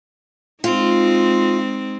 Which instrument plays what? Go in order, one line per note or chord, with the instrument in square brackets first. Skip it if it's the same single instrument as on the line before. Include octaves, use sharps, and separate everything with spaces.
[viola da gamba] G#3 C4 D#4 [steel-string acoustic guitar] F4